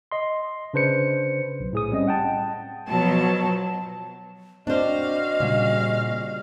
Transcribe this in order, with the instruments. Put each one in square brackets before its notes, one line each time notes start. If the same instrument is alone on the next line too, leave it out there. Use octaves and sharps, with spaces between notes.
[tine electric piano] D#5 C6
C#3 D4 B4 C5 C#7
B1
A2 G#4 D#6
G3 C4 C#4 D#5
F#5 G5 A5
[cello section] B2 F3 F#3 [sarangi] A5
[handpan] C4 D5 [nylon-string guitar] D4 C5 [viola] F#4 F5 [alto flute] D#5
[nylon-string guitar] A#2 [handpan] C#3 G3